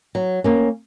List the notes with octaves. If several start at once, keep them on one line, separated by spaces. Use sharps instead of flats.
F#3
A#3 C#4